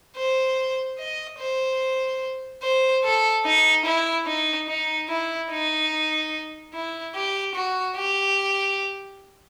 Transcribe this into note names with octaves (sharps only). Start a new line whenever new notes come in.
C5
D#5
C5
C5
A4
D#4
E4
D#4
D#4
E4
D#4
E4
G4
F#4
G4